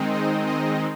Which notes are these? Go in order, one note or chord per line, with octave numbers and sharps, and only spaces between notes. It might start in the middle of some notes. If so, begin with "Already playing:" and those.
Already playing: D#3 G#3 C4 D#4
D#5
D#5